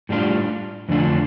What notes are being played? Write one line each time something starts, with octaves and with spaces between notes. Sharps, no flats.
A2 G3 D4 F4
F2 D3 A3 D4 F4